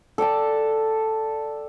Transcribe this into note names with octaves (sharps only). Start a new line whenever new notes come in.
A4 D5 G5 A5